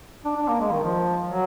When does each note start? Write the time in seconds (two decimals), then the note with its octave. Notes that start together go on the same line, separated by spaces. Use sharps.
0.25 D4
0.37 D4
0.48 A#3
0.60 G#3
0.72 D#3
0.83 F3
1.30 F#3